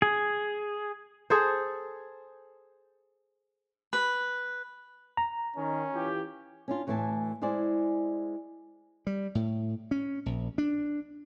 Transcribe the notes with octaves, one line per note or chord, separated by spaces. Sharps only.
G#4
G#4 A4 C5
B4
A#5
D#3 C#4
E3 F4 G4
C#4 D4 F4
D2 A2 E3 A3 G#5 A5
G#3 E4 G#4 C5 D5
G3
A2
C#4
A#1
D4